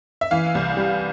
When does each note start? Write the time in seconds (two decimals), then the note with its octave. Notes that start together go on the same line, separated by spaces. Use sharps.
0.21 E5
0.31 E3 F5
0.55 C2
0.77 G3